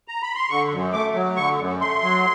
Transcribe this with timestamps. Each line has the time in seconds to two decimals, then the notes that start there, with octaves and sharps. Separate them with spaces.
0.08 A#5
0.22 B5
0.36 C6
0.50 D3 C#6
0.72 F#2
0.93 A3 D6
1.15 F#3
1.36 D3 C#6
1.59 F#2
1.80 A3 C6
2.02 F#3